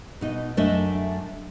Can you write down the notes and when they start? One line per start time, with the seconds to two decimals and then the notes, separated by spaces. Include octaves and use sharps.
0.21 B2 D#4
0.57 F#2 A3 D4 D#5 E5